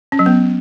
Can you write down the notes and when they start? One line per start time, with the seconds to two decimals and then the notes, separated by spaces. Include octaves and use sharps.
0.12 C#4
0.19 F#3
0.26 B3